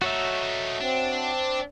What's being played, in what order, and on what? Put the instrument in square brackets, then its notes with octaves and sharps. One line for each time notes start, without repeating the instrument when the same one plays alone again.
[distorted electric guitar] A3 D#4 [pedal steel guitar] F#4 C#5 E5
[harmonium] C4 [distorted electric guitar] D4